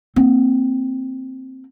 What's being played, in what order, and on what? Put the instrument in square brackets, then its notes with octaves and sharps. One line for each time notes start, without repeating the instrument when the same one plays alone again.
[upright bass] A#3 C4